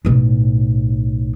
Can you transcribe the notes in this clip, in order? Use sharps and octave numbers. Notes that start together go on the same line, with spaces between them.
B1 A2